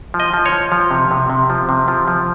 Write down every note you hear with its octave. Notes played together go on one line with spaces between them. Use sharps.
F3
D#5
F3
C#5
F3
F3
C3
C3
C3
F3
C3
F3
F3